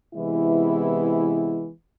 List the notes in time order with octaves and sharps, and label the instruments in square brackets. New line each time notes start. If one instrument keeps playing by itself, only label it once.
[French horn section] C3 E3 G#3 B3 E4